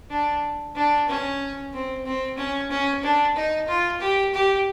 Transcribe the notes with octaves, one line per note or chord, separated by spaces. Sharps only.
D4
D4
C#4
C4
C4
C#4
C#4
D4
D#4
F4
G4
G4